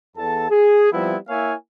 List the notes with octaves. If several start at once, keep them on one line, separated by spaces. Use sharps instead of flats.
E2 A4 A5
G#4
F3 G3 B3 C4 E4
A#3 E4 C#5 E5 F5 G#5